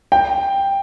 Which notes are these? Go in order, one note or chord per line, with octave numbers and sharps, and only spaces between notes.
G5